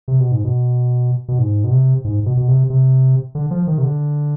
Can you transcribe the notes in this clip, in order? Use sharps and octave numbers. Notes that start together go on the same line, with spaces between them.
C3
B2
G#2
B2
B2
G#2
B2
C3
G#2
B2
B2
C3
C3
D3
F3
D#3
C3
D3